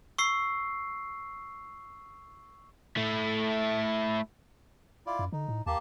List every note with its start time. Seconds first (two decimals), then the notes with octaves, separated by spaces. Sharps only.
0.18 C#6 E6 C7
2.97 A3 E4
5.06 E4 F4 D5
5.19 F#2
5.33 D3 D#4
5.49 A2
5.66 D#2 A#3 G4 A5